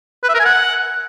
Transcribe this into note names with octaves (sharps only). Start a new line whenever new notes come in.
B4
E5
A#4
G#5
F#5